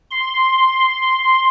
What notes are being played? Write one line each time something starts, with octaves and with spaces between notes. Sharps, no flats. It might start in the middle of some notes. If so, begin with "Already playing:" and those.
C6